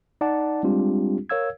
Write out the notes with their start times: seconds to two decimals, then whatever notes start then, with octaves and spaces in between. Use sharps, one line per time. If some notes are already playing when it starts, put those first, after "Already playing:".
0.21 D#4 D5 F#5 A5
0.63 G3 G#3 C4 D4 F4 G4
1.30 A#4 C#5 F5 E6 G#6